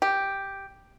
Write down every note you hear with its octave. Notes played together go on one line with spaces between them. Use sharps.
G4